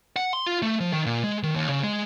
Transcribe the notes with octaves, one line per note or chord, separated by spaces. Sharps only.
F#5
C6
F4
A3
F3
D#3
A#2
G#3
D#3
D#2
C#3
G#3